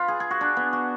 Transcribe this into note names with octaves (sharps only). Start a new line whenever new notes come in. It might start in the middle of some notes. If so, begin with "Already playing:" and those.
Already playing: F4 B4
G#4
G#4
F#4
D4
B3
F#4